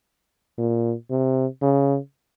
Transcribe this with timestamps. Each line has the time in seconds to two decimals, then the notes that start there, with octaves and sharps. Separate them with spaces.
0.58 A#2
1.10 C3
1.62 C#3